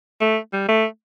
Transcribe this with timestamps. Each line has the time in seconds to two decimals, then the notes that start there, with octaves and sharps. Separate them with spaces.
0.21 A3
0.53 G3
0.69 A3